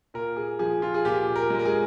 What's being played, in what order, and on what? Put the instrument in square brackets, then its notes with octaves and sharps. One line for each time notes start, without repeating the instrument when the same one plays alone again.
[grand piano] A#2 A#4
G#4
F3 G#4
F4
G#4
A#2 G4
A#4
G#3
A#4
G#4